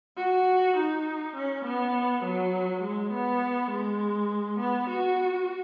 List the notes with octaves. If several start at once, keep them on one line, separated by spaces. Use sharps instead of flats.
F#4
D#4
C#4
B3
F#3
G#3
B3
G#3
B3
F#4